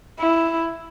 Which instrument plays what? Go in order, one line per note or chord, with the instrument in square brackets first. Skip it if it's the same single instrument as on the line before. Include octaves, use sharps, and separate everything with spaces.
[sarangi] E4